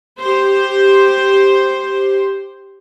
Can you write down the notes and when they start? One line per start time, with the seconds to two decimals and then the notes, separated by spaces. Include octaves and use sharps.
0.20 G4 C5